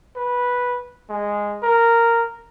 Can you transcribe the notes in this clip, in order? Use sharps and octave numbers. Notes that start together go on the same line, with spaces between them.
B4
G#3
A#4